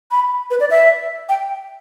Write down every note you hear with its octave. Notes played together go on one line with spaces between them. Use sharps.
B5
B4
D5
E5
G5